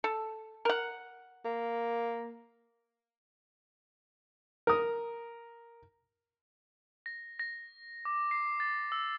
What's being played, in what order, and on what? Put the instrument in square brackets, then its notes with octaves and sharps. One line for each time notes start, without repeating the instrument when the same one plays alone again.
[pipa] A4
A#4 F#5
[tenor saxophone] A#3
[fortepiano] A#4 D#6
[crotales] A#6
A#6
D6
C7
A6
E6